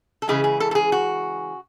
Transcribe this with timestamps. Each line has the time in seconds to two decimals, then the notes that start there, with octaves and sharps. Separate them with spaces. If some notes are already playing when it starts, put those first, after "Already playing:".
0.22 A4
0.28 C#3 E3 G#3 G#4
0.44 G#4
0.60 A4
0.71 A4
0.75 G#4
0.92 F#4